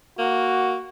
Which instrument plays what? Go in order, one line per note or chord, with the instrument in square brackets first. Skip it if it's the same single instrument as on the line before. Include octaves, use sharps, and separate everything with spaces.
[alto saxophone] A#3 [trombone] F#4